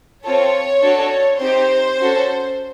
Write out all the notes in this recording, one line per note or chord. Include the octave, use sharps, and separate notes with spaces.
C4 F4 A4 C#5
D4 F#4 A4
C4 D#4 G4 C5
C#4 F#4 A4